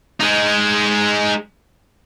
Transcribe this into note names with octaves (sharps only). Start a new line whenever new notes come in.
G#3 D#4